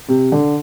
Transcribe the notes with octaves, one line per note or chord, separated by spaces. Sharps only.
C3
D3